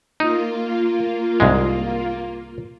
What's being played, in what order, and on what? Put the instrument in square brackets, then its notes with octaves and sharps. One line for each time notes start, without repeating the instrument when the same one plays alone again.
[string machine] A#3 F4 [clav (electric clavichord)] D#4
[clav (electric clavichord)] C2 G#2 G#3